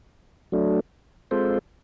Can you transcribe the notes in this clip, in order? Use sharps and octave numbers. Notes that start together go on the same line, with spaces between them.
F#3 A3 D4
G#3 C4 F4 A4 C5